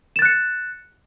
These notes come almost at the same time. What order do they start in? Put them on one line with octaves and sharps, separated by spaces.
E7 A6 F#6 C#7